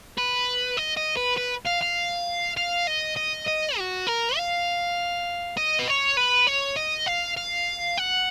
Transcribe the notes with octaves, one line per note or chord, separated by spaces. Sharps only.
B4
D#5
D#5
B4
B4
F5
F5
F5
D#5
D#5
D#5
F#4
A#4
F5
D#5
B4
C#5
B4
C#5
D#5
F5
F5
F#5